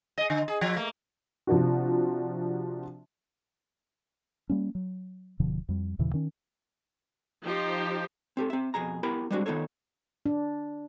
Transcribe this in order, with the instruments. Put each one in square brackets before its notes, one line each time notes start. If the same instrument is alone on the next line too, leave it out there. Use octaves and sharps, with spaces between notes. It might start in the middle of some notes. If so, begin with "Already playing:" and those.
[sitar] G#4 D#5
D3
G#4
F3
A3 A#3
[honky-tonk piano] C3 F3 D4 F#4
[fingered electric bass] G3 A#3 C#4
F#3
D1 B2 D3 F3
F2 G3
D#2 A#2 C#3 E3
D#3 C#4
[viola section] F3 D#4 G4 C5
[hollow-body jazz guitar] C4 G4 A4
C4 E5
F2 B2 G#4 A#5
B3 E4 G4 A#4 G5 B5
G3 G#3 C4 D4 F4 F#4
D#3 B3 D#4 F4 A4 C#5
[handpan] D4